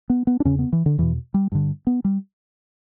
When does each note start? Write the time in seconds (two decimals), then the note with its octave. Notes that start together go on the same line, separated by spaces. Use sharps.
0.10 B3
0.27 B3
0.40 D4
0.45 E2 C#3 C#4
0.59 B3
0.73 E3
0.86 D3
0.98 E2 B2 E3
1.34 G3
1.52 G2 D3
1.87 B3
2.04 G3